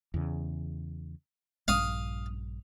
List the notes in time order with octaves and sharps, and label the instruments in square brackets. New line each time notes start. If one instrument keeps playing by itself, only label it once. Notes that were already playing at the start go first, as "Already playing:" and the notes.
[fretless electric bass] E2 C#3
[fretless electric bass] A#1 G2 [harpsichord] F5 D#6